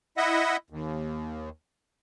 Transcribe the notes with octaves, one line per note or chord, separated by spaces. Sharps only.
E4 D#5 E5 F#5
D#2